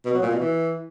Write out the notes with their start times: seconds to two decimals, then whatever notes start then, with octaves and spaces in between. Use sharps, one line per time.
0.05 B2
0.14 F#3
0.22 A#2
0.31 B2
0.39 E3